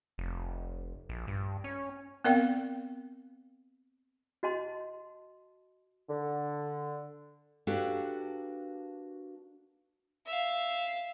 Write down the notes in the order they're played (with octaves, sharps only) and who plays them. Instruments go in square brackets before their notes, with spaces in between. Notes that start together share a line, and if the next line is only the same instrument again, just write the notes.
[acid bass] F1
A#1
G2
C#4
[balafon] B3 C4 A#4 D5 F5 G5
[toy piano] F#4 D#5 A5 C6
[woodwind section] D3
[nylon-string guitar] A#3 D4 F#4 G4 A4 B4
[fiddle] E5 F5